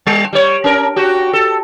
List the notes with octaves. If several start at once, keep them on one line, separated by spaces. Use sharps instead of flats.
G3
G3 C#5
C#4 A#4
F#4 G4
A4